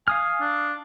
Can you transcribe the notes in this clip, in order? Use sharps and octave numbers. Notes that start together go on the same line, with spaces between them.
F5 G#5 D#6 F6
D4